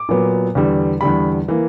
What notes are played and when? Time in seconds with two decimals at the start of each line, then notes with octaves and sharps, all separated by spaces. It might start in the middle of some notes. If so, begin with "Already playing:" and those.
Already playing: D6
0.09 A#2 F#3 B3
0.55 E2 D3 G3
1.01 E2 D3 G3 B5
1.48 E3 A#3